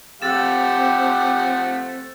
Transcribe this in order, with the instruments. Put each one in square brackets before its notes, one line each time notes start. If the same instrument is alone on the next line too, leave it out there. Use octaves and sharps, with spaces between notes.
[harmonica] F3 A3 F#5 [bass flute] C4 [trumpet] G4 [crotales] E6 A6 E7